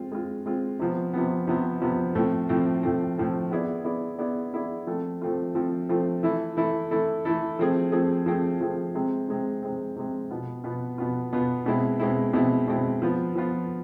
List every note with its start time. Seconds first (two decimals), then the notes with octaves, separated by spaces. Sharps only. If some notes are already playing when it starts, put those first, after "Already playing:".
Already playing: G#3 C4 F4
0.12 G#3 C4 F4
0.46 G#3 C4 F4
0.79 C3 F3 B3
1.14 C3 F3 B3
1.47 C3 F3 B3
1.82 C3 F3 B3
2.15 A2 F3 A3 C4
2.49 A2 F3 A3 C4
2.83 A2 F3 A3 C4
3.17 A2 F3 A3 C4
3.51 B3 E4 G#4 D5
3.85 B3 E4 G#4 D5
4.19 B3 E4 G#4 D5
4.53 B3 E4 G#4 D5
4.87 F3 A3 C4 F4 A4
5.21 F3 A3 C4 F4 A4
5.55 F3 A3 C4 F4 A4
5.89 F3 A3 C4 F4 A4
6.23 E3 A3 E4 A4
6.57 E3 A3 E4 A4
6.91 E3 A3 E4 A4
7.25 E3 A3 E4 A4
7.59 F3 A3 C4 G#4
7.92 F3 A3 C4 G#4
8.26 F3 A3 C4 G#4
8.61 F3 A3 C4 G#4
8.95 C3 G#3 C4
9.28 C3 G#3 C4
9.63 C3 G#3 C4
9.96 C3 G#3 C4
10.31 B2 B3 F4
10.64 B2 B3 F4
10.98 B2 B3 F4
11.33 B2 B3 F4
11.66 B2 G#3 C4 E4
11.99 B2 G#3 C4 E4
12.33 B2 G#3 C4 E4
12.68 B2 G#3 C4 E4
13.02 F3 B3 F4
13.35 F3 B3 F4